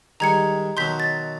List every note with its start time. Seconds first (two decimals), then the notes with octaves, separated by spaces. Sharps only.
0.20 D#3 G3 G#3 A#5 G#6 C#7
0.77 B2 D#3 F#3 C6 G6 B6
1.00 A6